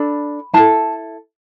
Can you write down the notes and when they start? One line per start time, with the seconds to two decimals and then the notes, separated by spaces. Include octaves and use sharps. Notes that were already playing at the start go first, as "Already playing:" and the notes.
Already playing: D4 A4 B5
0.54 E4 A4 A5